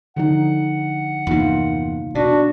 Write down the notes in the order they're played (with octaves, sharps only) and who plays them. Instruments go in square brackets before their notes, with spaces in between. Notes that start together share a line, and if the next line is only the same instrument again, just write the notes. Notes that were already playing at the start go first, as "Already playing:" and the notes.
[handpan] D3 F3 D#4 [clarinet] F#5
[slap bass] E2 G2 C3 [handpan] A#3 D#4 F4
[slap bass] B2 [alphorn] D4 [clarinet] F#4